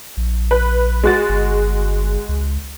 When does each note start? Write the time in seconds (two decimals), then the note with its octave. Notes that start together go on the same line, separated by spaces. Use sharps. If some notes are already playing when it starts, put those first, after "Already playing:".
0.17 A#1
0.51 B4
1.04 G#3 F#4 A6
1.29 G1
2.29 C#2